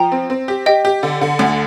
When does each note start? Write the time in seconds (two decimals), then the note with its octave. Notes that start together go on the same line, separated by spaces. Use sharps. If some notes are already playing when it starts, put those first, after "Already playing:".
Already playing: F3 G5 A#5
0.12 C4
0.30 C4
0.48 G4
0.66 G4 D#5 G5
0.85 G4
1.03 D3
1.21 D3
1.39 D2